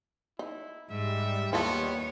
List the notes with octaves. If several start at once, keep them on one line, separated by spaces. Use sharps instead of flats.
D#4 E4
G#2 G3 E5
D#2 B3 E4 F4 A4 C#5